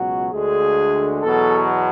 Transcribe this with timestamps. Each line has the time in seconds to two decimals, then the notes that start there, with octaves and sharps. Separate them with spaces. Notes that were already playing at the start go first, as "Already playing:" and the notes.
Already playing: C#2 B2 F#3 F#4
0.31 D2 D3 G#3 G#4
1.23 E2 B2 F#3 A4